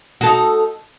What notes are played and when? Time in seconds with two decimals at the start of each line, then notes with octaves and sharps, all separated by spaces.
0.21 F#4
0.23 A4
0.26 D#4